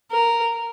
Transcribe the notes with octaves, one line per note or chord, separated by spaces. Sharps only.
A#4